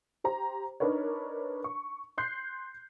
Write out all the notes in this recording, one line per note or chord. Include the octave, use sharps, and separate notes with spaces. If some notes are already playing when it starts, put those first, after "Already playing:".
G4 C5 A#5
D4 D#4 A#4 B4 C#5
C#6
C6 F#6 G6 C7